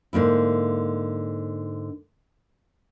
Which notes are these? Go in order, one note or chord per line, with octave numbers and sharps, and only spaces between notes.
G#2 D3 A#3 E4